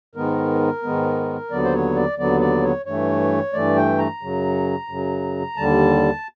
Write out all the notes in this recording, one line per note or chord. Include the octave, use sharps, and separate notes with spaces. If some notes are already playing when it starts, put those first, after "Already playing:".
G#2 D#3 G#3 B3 A#4
G#2 D#3 G#3 B3
D#2 D3 F#3 B3 D5
C5
C#5
D5
D#2 D3 F#3 B3 D5
D5
C#5
G2 E3 A3 C#5
G2 E3 A3 D5
G5
A#5
F#2 C#3 F#3
F#2 C#3 F#3
D#2 D3 G3 A5